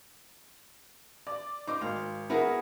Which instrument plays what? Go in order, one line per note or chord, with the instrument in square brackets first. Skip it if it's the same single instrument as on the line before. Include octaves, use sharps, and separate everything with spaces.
[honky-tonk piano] D5
[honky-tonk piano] D#4 D6 [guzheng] C5
[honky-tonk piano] G#1 [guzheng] F5
[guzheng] B3 F#4 G#4 [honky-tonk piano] E4 A#4